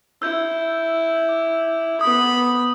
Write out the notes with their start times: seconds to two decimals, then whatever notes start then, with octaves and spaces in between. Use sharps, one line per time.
0.22 E4 E6 G6
1.29 D6
2.01 B3 B5 D#6